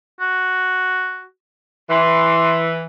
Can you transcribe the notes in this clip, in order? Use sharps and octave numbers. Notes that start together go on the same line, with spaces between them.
F#4
E3 C6